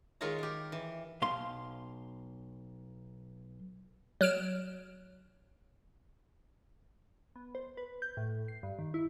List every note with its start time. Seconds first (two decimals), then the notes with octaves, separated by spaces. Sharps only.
0.21 D#3 G#3 F4 A#4 C#5 A#5
0.38 G4 A#4
0.72 E3
1.22 B1 F5 C6
4.21 F#3 F6 D7 E7
7.36 B3
7.55 C5
7.77 B4
8.02 G6
8.17 A2
8.48 C7
8.63 G2
8.79 D#3
8.94 E4